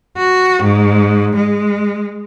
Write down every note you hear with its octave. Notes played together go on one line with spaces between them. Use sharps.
F#4
G#2
G#3